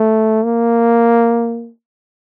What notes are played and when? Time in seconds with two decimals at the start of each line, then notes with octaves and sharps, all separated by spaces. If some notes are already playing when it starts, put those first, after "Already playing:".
Already playing: A3
0.44 A#3